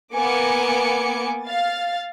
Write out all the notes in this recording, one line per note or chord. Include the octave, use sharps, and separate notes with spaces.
A#3 B3 G#5 D6 C#7
F5 A6